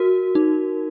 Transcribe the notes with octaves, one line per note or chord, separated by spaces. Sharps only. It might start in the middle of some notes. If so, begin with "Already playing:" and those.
Already playing: F#4 A#4
D#4